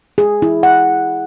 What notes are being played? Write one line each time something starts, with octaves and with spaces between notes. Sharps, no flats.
G#4
E4
F#5